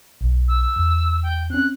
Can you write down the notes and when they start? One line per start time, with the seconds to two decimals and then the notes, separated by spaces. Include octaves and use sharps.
0.21 B1
0.48 E6
0.76 E2
1.23 G5
1.50 C4 C#4 F#6